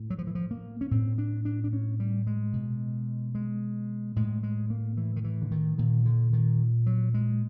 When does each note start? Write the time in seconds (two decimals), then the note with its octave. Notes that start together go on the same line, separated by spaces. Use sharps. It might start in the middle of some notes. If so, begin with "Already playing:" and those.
Already playing: A2
0.10 F#3
0.19 F3
0.27 E3
0.35 F3
0.51 A#3
0.81 C#4
0.91 A2 C4
1.18 D4
1.45 D4
1.64 D4
1.73 C#4
2.00 G3
2.27 G#3
2.53 B2
3.35 G#3
4.16 A2 G#3
4.43 G#3
4.70 A#3
4.97 E3
5.16 D#3
5.24 E3
5.42 D3
5.51 D#3
5.78 A#2 D#3
6.06 D3
6.33 D#3
6.86 F#3
7.14 G#3